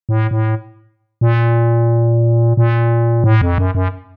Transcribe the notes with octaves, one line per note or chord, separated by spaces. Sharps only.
A2
A2
A#2
A#2
A2
F2
F#2
F#2